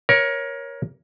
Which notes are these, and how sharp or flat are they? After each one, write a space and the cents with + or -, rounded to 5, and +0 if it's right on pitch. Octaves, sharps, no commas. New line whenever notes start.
A#4 +25 C#5 +0